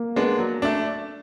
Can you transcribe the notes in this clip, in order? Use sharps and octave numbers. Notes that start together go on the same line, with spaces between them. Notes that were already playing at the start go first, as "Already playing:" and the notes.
Already playing: A#3
G#3 B3 D4
F#3
A3 D4